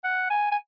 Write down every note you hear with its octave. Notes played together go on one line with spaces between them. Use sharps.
F#5
G#5
G#5